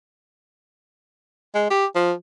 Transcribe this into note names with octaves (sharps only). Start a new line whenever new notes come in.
G#3
G4
F3